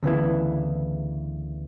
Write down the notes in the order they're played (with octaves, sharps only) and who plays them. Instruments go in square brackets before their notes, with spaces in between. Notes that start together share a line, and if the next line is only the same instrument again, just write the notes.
[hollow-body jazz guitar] D2 C#3 E3 B3 E4